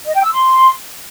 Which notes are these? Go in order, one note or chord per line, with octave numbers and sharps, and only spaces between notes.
D#5
G5
E6
C6